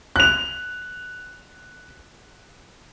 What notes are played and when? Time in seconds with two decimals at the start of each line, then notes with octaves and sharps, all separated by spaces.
0.16 F#6 F7